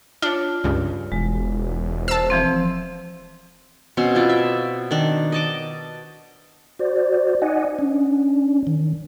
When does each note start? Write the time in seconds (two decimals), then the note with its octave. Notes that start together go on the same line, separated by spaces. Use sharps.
0.22 D4 F4 C#5
0.64 C#2 G2
1.12 E1 G#3
2.08 C5 A5 E6
2.30 E3 F3 C4
3.97 B2 C4 C#4 C6
4.15 E4 F4 D5
4.29 E5
4.91 D#3 D4
5.32 D#5 A5 D6
6.79 F#4 C5 D5
7.42 D#4 D5 D#5 F#5 G#5
7.79 C#4 D4
8.67 D#3